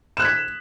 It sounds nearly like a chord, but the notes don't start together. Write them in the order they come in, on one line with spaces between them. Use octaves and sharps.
E7 F#6 G#6 B6